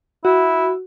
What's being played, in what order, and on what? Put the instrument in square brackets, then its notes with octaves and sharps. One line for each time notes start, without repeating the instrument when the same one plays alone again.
[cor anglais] E4 [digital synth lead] F#4